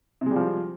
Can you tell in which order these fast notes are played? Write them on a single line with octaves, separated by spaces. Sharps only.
C3 G#3 G3 F3